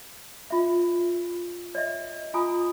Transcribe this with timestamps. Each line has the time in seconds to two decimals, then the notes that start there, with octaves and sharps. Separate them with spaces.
0.50 F4 E5
1.75 C#5 D#5 E5
2.34 F4 G#5 A#5 D#6